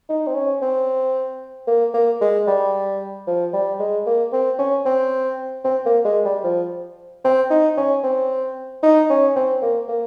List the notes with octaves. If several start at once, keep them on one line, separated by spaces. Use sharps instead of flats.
D#4
C4
C#4
C4
A#3
A#3
G#3
G3
F3
G3
G#3
A#3
C4
C#4
C4
C4
A#3
G#3
G3
F3
C4
D#4
C#4
C4
D#4
C#4
C4
A#3
A#3